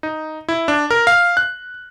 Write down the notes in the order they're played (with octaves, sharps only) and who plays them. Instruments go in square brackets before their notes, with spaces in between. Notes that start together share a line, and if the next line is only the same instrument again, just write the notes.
[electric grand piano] D#4
E4
D4
A#4
F5
F#6